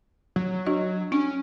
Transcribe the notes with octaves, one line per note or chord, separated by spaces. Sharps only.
F#3
D4 F#4 D#5
C#4 D4